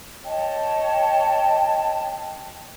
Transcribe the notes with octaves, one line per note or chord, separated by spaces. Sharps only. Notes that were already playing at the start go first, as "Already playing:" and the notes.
C#5 D#5 G5 A5